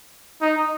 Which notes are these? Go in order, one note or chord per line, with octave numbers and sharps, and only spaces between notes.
D#4